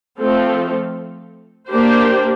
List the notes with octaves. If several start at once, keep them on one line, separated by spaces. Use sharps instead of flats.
F3 A3 C4 F4 A4
A#3 D4 G4 C5